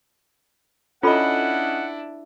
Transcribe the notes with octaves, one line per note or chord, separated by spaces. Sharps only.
C#4 D4 E4 F4 A4 D#5 F#5 B5